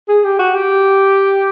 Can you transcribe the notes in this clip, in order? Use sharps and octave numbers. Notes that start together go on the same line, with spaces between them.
G#4
G4
F#4
G4